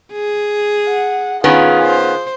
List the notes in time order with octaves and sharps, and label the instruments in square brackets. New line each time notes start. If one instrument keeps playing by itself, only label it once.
[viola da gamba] G#4
[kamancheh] F#5
[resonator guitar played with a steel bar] D#3 B3 C#4 [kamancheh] F4 G#4
[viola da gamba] C5